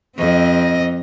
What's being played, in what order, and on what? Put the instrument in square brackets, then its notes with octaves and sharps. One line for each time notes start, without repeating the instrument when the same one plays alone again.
[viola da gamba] F2 [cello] C4 D#5